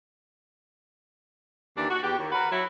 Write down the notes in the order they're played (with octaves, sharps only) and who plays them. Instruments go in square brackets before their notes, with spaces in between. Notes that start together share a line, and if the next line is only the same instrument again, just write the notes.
[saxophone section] D#2 E3 D4
F#4
E2 G4
D#2
F#4 A#4 B4
F#3 E4